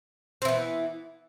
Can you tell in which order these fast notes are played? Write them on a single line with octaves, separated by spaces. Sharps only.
C4 E3 B3